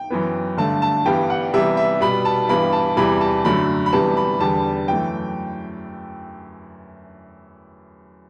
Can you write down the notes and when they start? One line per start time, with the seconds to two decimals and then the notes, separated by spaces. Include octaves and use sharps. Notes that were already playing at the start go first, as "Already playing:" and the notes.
Already playing: G5
0.10 F#2 E3 B3
0.57 G2 D3 A3 A5
0.82 A5
1.06 G2 E3 G3 B3 G5
1.30 F#5
1.53 C3 E3 G3 B3 E5
1.77 E5
2.01 B2 G3 B3 B5
2.25 A5
2.49 G2 E3 G3 B3 B5
2.72 A5
2.97 E2 C3 E3 G3 B5
3.21 A5
3.45 F#2 D3 F#3 A3 B5
3.86 B5
3.92 C3 E3 G3 B3 A5
4.17 B5
4.40 E2 D3 G3 B3 A5
4.88 F#2 E3 A3 G5